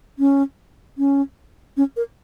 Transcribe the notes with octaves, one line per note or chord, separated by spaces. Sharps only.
C#4
C#4
C#4
A#4